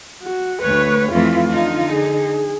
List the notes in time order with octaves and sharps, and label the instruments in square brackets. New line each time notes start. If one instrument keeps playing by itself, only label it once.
[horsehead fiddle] F#4
[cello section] D2 C#5 [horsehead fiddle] B4
[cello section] F2 E3 A3 [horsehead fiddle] F4
[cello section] D3 D#4
[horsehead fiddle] G#4